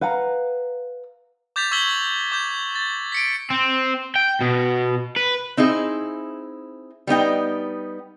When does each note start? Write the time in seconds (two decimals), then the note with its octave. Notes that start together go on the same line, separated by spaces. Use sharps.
0.01 B4 F5 F#5 A#5
1.56 D6 G6 A6 B6 F7
1.71 C#6 E6 G#6 B6 F#7 G7
2.32 D6 G6
2.75 A6
3.12 B6 C#7 D7
3.50 C4
4.16 G5
4.41 B2
5.16 B4
5.57 C4 D#4 E4 G#4
7.07 G3 B3 D#4 G5